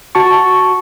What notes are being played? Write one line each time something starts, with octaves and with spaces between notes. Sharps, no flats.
F#4 A5 C#6